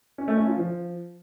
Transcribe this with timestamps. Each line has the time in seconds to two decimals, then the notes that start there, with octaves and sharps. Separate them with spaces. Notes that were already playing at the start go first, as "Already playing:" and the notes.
0.18 C#4
0.28 A3
0.37 C#4
0.47 F4
0.56 F3